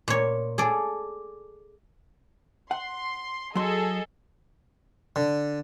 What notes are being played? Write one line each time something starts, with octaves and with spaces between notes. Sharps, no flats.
A#2 C#5
G#4 A4 D5
F#5 C6
F#3 G#4 A4 D#5 C6
D3